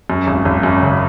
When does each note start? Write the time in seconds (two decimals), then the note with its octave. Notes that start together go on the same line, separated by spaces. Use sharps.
0.10 F#2
0.27 G#1
0.45 G#1
0.63 F#2
0.82 C#3